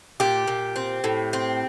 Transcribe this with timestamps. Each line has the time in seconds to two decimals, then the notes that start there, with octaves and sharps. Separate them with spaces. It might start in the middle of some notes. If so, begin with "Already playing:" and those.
0.20 A#2 G4
0.48 A#2
0.76 C4
1.04 A2
1.33 C4